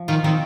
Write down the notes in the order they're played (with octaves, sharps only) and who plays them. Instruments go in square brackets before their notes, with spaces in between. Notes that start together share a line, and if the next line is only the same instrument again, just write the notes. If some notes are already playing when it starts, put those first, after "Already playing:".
Already playing: [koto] F3
[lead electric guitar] D#3 [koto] F4
[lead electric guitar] D#3 [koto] C4